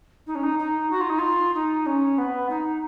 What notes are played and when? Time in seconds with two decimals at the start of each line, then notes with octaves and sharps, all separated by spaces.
0.26 D#4
0.35 C#4
0.43 D#4
0.58 D#4
0.90 F#4
1.00 F4
1.09 D#4
1.18 F4
1.54 D#4
1.86 C#4
2.18 B3
2.49 D#4